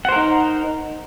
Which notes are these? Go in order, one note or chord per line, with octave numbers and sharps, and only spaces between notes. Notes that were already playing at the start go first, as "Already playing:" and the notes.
D#4 A#4 C5 F#5